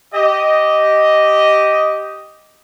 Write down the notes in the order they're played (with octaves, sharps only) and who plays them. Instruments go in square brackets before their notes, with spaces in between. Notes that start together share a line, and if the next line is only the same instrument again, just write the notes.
[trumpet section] G4 D#5